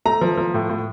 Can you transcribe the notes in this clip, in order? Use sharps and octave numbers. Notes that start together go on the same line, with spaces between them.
A3 A#5
F3
F3
A2
A2